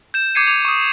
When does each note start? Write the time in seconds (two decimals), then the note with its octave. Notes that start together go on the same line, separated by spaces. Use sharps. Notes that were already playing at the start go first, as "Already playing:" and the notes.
0.14 G6 E7
0.35 D6 G6 G#6 C7 C#7 D#7
0.47 D6 G#6 F7
0.65 C#6 D#6